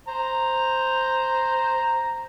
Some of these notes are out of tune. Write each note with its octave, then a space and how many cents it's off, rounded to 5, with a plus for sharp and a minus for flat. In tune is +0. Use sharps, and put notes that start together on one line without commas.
C5 +0 A#5 +0